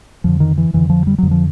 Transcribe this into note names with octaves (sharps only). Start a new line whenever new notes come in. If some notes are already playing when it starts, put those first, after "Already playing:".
F2 D3 F3
D#3
E3
F2 D3 E3
F3
G3
F2 D3 F#3
F3